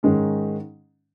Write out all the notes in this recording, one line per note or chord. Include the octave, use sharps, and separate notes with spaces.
G#2 D#3 G#3 C#4